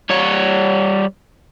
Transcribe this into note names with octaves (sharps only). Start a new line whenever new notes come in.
G3 C#5